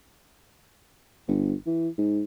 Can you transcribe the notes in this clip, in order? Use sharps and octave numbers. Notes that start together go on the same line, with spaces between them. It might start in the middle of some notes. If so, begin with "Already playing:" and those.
G1
E3
G#2